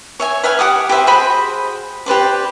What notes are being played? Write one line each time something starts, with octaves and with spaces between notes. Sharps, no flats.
C#5 E5 G#5
B4 E5 F5 G#5
G4 F#5 D6 D#6
G4 B4 C5 E5
F#4 G#4 C5 B5
G4 B4 C5 D5